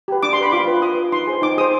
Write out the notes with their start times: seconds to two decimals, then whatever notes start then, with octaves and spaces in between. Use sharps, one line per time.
0.08 G4 B4
0.23 D4 D6
0.33 C6
0.38 G4 B4 B5
0.52 F4 D6
0.68 B4
0.82 F4 D#6
0.97 B4
1.12 D#4 C6
1.27 G#4 C5
1.42 D#4 D6
1.58 G#4 C5 D#6